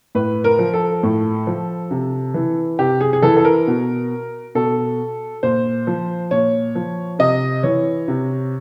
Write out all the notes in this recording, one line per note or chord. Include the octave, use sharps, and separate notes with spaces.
A2 B4
A#4
F3
A4
A2
F3
C3
E3
C3 G4
G#4
G#4
E3 A4
A4
A#4
B2
B2 A4
A#2 C5
F3
A#2 C#5
F3
C3 D#5
E3 C#5
C3